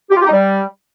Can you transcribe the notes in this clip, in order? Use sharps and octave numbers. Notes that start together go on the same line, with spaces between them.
G4
F4
G4
D#4
G3